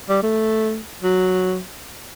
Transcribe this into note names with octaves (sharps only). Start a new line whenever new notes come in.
G3
A3
F#3